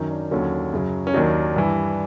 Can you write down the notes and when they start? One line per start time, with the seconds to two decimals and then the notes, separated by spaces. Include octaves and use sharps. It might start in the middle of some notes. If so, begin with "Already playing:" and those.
Already playing: F#2 D#3 F#3 C#4 D#4
0.11 D4
0.31 D#2 D3 F#3 C#4
0.73 F#2 C#3 F#3
1.07 C#4
1.14 D#2 D#3 F#3 D4
1.56 G2 E3